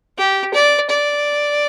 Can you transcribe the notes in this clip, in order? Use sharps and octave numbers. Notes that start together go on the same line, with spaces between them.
G4
D5
D5